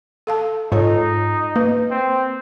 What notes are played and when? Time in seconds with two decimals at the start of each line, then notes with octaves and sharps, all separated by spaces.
0.27 A4 F5 A5
0.72 G#2 D#4 F4 A4 C#5
1.56 A#3 B4
1.91 C4